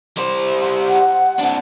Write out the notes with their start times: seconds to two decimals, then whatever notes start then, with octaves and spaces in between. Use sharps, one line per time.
0.17 G3 C5
0.89 F#5
1.39 C4 D4